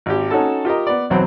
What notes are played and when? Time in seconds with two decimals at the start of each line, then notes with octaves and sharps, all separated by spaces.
0.06 G#1 G4
0.31 C#4 D#4 F#4 A4 A5
0.65 F4 G4 A#4 D#5
0.87 B3 D5
1.10 B1 E2 F#3 C4